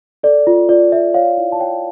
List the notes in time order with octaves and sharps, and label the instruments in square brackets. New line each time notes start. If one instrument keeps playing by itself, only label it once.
[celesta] A4 D5
F4
F4 D5
D5 E5
C#5 F5
E4
A5
C#5 G5